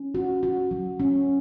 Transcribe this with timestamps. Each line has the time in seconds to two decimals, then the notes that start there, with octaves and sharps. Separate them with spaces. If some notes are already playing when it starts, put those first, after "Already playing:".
Already playing: C#4
0.15 F#4
0.43 F#4
0.71 F#3
1.00 C#4